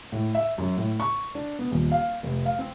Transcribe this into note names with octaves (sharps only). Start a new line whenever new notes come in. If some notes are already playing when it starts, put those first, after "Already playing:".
A2
E5
F#2
A2
C#6
D4
B3
D#1
F5
F1
F5
C4